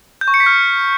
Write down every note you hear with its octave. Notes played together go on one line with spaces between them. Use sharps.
G6
C#6
C#7
B6
F6